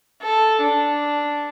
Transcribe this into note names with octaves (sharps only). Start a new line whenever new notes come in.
A4
D4